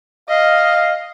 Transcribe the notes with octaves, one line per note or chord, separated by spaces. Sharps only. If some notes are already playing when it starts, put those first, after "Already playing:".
D#5 F5